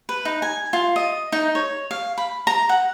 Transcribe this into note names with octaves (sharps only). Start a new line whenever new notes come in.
B4
D#4
G#5
F4
D#5
D#4
C#5
F5
B5
A#5
F#5